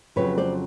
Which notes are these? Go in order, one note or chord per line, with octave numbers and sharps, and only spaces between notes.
F2 C#3 F#3 B4 C#5
C5 D5